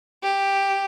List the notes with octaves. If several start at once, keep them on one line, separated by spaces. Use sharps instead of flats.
G4